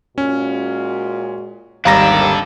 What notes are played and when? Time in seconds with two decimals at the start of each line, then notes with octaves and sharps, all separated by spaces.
0.18 A#2 G#3 C#4 F#4
1.85 G#1 D#2 G3 D4 A4 F5 A#5 A#6